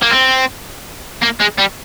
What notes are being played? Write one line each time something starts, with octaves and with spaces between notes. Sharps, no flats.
A#3
C4
A#3
G#3
G3